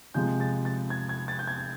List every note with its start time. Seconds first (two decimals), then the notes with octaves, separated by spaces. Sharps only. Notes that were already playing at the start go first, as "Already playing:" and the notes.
0.14 C3 F3 G#3 G6
0.40 A6
0.65 A6
0.90 G#6
1.09 G#6
1.28 A6
1.39 G6
1.48 G#6